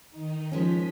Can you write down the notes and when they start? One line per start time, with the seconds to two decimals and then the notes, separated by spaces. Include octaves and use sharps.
0.11 D#3 D#4
0.52 F3 G#3 C#4 B6